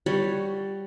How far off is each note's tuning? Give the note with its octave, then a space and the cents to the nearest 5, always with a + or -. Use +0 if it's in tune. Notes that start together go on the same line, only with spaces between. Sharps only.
G3 +0 F#4 +15 C#5 +0